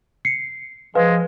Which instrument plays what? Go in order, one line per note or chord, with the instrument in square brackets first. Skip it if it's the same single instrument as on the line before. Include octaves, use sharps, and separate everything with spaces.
[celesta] C7 C#7
[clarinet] F3 [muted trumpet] G#3 [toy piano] B4 [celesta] F5